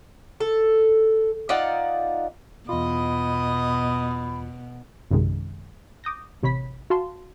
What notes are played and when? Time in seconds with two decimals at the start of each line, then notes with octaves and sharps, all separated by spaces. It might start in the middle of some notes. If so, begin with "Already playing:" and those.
0.40 A4
1.49 D#4 F4 D5 F#5
2.69 E2 B2 F4 D#5 B5 D#6
5.11 A#1 F#2 C3 D#3 G#3
6.04 D6 D#6 G6 A#6
6.43 A1 C3 C#5 B5 B6
6.90 F#4 F5 A5 C6